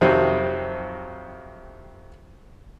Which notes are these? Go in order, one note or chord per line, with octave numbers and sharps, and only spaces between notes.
F2 C3 D#3 F#3 C4